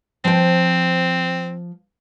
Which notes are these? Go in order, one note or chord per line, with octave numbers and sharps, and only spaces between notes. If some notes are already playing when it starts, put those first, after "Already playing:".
F3 C4 G5